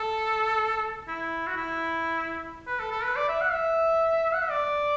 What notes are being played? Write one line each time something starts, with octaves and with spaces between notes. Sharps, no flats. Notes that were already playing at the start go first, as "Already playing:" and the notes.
Already playing: A4
E4
F#4
E4
B4
A4
A4
B4
D5
E5
F#5
E5
F#5
E5
D5